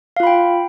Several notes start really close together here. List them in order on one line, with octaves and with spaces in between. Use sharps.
F5 F4 B5 G5